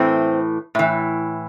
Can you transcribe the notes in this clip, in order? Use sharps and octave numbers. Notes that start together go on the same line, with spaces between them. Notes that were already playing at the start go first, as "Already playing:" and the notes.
Already playing: A2 E3 C4
A2 E3